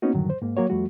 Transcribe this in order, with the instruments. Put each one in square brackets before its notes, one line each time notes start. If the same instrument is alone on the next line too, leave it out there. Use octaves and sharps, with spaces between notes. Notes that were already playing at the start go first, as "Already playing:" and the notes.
[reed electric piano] A#3 B3 C#4 D#4 F#4
F#2 A2 D3 D#3 F#3 G3
C5
G#2 A#3
F#3 A#3 F#4 C#5
F2 F3 G3 A3 F#4